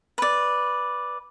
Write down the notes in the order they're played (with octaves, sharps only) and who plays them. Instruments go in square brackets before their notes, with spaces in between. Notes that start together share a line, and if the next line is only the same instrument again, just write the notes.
[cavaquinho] B4 D5